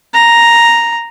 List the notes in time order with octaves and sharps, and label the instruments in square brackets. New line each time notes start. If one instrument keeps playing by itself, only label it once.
[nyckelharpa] A#5